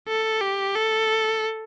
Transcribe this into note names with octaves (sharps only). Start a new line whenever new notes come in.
A4
G4
A4